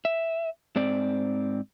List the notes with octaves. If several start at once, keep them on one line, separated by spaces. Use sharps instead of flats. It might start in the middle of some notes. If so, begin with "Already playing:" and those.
E5
G#2 C4 D5